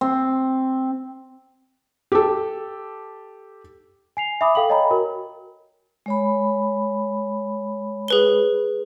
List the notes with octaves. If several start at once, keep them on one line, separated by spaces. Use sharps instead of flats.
C4
G4 A4
G#5 C7 F7
E5 G#5 B5 D6 D#6
A4 F5 G5 F#7
C#5 D#5 G5 G#5 A#5 B5
F#4 A#4
G#3 C#5 B5
G#4 B4 G7